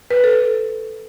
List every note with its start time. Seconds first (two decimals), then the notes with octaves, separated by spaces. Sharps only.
0.11 B4
0.24 A4